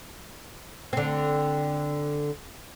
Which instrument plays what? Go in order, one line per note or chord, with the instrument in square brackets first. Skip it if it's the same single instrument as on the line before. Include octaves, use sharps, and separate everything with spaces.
[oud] D3 C4